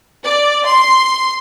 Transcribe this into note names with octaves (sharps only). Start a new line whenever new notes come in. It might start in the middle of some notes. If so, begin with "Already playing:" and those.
D5
C6